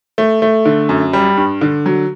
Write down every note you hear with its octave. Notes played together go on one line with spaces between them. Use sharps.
A3
A3
D3
F#2
G3
G2
D3
F#3